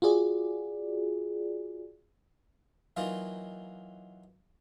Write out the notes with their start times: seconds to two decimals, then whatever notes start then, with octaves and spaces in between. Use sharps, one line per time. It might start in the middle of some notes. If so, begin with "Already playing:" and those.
0.02 F4 F#4 G#4 D5
2.97 E3 F#3 A#3 D#4 F4